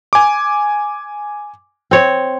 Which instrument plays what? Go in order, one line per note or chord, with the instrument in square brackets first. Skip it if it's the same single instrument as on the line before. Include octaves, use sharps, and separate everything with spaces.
[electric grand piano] G#5 D6
[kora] C4 C#5